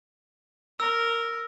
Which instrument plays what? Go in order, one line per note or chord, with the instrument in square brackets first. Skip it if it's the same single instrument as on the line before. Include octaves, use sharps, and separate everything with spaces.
[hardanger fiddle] A#4 [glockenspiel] E6